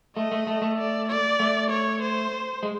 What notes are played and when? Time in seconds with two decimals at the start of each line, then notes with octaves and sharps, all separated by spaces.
0.16 A3 D#5
0.32 A3
0.47 A3
0.62 A3
0.78 D5
1.08 D5
1.40 A3
1.70 C#5
2.01 C5
2.63 G#3